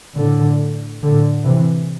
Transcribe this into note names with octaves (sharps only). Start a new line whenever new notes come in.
A2 D3
A2 D3
C3 E3